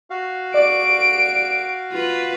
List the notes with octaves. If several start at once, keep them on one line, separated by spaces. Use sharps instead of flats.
F#4 F5
D5 D7
F4 B4